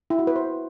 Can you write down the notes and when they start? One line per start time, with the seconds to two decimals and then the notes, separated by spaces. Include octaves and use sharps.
0.10 E4
0.19 F#4
0.27 B4
0.36 C5